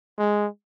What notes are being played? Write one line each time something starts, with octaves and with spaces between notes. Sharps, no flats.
G#3